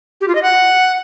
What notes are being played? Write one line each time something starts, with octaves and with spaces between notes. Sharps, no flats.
G4
F4
D#5
F#5